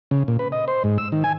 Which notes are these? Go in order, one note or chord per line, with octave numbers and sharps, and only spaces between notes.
C#3
A#2
B4
D#5
C5
G#2
E6
D#3
G#5